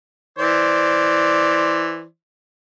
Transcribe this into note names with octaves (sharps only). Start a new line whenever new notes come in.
E3 C5 D5